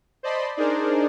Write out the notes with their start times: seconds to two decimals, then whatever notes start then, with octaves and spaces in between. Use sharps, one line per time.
0.23 C5 D5 D#5 A5 B5 C6
0.57 D4 D#4 G#4 A#4 C5 D5